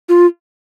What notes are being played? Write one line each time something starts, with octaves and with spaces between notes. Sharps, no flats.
F4